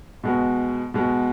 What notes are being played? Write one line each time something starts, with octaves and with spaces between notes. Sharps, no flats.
B2 G#3 B3 F#4
B2 G#3 B3 F#4